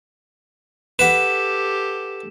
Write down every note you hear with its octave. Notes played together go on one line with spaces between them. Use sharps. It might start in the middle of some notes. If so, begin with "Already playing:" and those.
G4 A4 B4 F#5 B5 E7